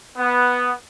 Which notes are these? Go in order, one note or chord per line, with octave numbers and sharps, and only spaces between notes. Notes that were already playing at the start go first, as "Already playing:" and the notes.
B3